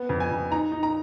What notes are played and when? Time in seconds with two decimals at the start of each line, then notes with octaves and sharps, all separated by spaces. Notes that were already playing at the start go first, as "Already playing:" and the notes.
Already playing: B3
0.09 F2
0.20 G#5
0.31 F2
0.51 D#4 A#5
0.72 D#4
0.83 A#5